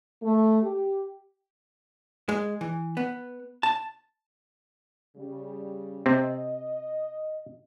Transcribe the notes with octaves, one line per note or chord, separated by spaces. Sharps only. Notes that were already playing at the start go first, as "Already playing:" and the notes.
A3
G4
G#3
E3
B3
A5
C#3 G3
C3 C4 D#5